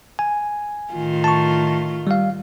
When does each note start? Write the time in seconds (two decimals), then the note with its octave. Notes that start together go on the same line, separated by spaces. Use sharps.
0.19 G#5
0.93 A2 D#3 F4
1.24 A5 C#6
2.07 G3 F5